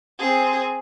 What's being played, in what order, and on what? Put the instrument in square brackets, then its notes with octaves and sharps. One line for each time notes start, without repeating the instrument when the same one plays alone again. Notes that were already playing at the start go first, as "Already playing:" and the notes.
[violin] C4 G#4